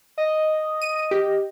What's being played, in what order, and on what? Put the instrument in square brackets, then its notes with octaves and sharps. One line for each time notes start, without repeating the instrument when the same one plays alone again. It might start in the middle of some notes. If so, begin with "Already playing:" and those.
[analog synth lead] D#5
[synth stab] D#7
G4